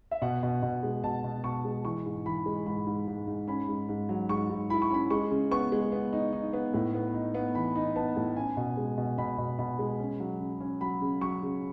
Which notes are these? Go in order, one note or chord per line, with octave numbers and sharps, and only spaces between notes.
E5
B2 F#5
B2
B2
G#3
B2 A5
B2
B2 C#6
G#3
E3 C#6
G#2
E3 B5
G#3
G#2 B5
G#2
G#2
G#2
C#4 B5
G#2
G#2
F#3
G#2 C#6
G#2
E4 B5
C#6
C#4 B5
G#3 C#6
C#3
B3 C#6
G#3
B3
D#4
D#4
B3
A2
B3
D#4
B3
E3 B5
D#4
B3 A5
A2
C#4 G#5
B2
G#3
B2
B2 B5
B2
B2 B5
G#3
C#4
F#3
C#3
C#4
F#3 B5
C#3
F#3 C#6
C#3